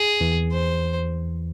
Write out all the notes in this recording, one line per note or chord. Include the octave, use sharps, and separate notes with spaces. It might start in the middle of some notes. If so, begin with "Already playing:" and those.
Already playing: G#4
E2 E3
C5